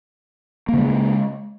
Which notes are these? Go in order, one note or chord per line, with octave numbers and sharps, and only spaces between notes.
C#3 G#3 A#3